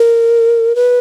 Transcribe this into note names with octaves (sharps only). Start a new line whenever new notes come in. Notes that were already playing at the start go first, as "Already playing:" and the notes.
Already playing: A#4
B4